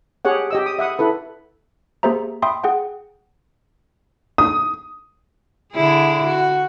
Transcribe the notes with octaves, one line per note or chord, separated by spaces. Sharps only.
G4 G#4 C#5 F#5
G4 D#5 E6
D#6
E5 F#5 D#6
E4 A4 B4
A#3 G4 G#4 C5 E5 A#5
E5 G5 B5 C6 D#6
G#4 F#5 G5
D#6
D3 E4 G#4
F#4